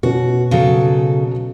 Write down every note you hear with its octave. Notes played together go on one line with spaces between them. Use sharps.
B2 B3 C#4 F#4
C#3 F#3 A4